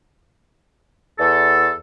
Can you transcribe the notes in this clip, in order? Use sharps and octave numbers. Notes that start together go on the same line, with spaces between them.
E2 A4